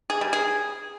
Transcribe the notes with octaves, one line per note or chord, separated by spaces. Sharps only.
G#4
G3
G#4